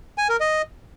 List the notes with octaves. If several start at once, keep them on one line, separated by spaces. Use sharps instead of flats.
G#5
A#4
D#5